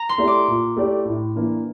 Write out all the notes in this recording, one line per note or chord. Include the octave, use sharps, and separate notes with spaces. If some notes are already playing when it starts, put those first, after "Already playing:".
Already playing: A#5
C6
A3 E4 G4 D5
D6
A#2
A3 E4 G4 D5
A2
E3 A#3 D4